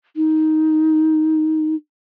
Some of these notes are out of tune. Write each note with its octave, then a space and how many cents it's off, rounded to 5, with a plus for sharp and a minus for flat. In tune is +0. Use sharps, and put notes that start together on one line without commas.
D#4 +10